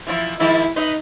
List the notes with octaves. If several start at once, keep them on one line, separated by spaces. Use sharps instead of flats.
E3 F3 E4
D#3 F3 G#3 E4
D#4 B4 D#5